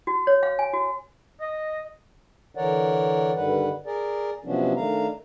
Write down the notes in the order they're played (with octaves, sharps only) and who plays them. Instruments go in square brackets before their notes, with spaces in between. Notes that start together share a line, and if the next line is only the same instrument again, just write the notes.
[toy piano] F#4
C#5
F5
G#5
F#4
[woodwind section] D#5
[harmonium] D3 E3 A#4 C#5 D5 F#5
G2 D3 D#3 G3 B4 F#5
G#4 A#4 D5
C3 F3 F#3 B3 C#4 D4
D#3 A3 D4 F5 A#5